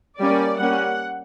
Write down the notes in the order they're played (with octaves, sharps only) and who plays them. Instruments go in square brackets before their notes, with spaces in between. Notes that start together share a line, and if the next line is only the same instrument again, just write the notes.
[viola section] G3 A#3 C#4 D5
G3 A#3 C#4 F#5